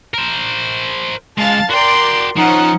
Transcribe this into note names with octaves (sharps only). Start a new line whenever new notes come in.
A#4 C5
C#2 G#3 F5 A5 A6
F#4 A#4 D5 G5 C6
F3 C#4 D#4 C5 F#5